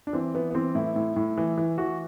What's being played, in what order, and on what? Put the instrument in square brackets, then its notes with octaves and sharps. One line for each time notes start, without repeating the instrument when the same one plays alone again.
[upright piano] D4
E3 C4
E3 B3
B3
E3 C4
A2 E4
A2
A2
E3
E3
E3 F#4